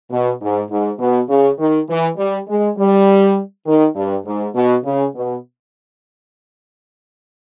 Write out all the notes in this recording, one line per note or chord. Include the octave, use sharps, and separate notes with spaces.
B2
G#2
G#2
B2
C#3
D#3
E3
G3
G#3
G3
D#3
G2
G#2
B2
C#3
B2